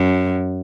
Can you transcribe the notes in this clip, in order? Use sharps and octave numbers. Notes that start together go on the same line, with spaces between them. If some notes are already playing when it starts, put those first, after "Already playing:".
Already playing: F#2